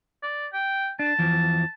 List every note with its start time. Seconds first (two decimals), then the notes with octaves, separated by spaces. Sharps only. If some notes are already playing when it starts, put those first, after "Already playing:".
0.22 D5
0.53 G5
0.99 D4 A5
1.19 E2 E3 F3